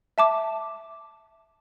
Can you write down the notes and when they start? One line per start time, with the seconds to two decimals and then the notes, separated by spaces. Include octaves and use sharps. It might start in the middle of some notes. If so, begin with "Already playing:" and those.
0.18 E5 A5 D6